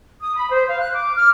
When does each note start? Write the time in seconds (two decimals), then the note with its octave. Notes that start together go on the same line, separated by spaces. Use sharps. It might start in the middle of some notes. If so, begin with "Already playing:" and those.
0.21 D#6
0.36 B5
0.50 C5
0.68 F5
0.80 F#6
0.93 D6
1.16 F6